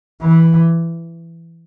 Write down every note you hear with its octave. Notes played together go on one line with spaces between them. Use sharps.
E3